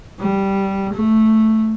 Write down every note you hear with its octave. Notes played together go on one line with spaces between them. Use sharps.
G3
A3